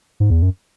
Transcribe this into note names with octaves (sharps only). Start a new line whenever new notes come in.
G#2
E2
F#2